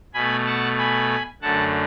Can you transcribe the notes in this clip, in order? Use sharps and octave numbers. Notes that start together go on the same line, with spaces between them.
B2 A3 G#5 B5
F#5 A5
G#5 B5
F#2 D3 A3 F#5 A5